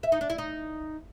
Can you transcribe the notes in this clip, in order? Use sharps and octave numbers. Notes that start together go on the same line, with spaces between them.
E5
D#4
D4
E4
D#4